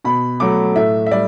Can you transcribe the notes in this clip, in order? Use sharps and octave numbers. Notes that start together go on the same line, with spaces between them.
B2 B5
F#3 A3 D6
A2 E5
E5
G3 D5